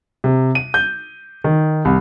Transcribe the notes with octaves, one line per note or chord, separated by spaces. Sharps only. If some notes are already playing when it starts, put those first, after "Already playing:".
C3
D#7
G6
D#3
C2